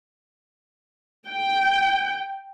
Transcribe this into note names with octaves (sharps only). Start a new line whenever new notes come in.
G5